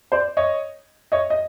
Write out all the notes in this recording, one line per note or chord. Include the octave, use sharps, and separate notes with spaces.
C5 D5
C#5 D#5
C#5 D#5
D#5